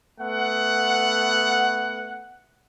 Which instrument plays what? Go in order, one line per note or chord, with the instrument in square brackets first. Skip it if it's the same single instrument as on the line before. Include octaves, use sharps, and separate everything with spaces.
[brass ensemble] A3 B3 F#5